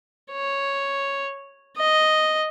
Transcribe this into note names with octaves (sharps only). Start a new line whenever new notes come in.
C#5
D#5